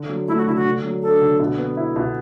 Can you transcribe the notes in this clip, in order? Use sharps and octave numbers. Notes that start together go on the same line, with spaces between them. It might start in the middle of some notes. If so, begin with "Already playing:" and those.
Already playing: D3
F#3
A3 E4
F#4
D3 E4
F#4
D3
F#3
D4 A4
D3
B2
B3
E4
B2